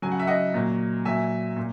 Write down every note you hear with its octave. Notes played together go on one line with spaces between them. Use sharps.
C#3 F#3 G#5
F#5
E5
D#5 F#5
A#2 F#3
A#2 F#3 E5 G#5
A#2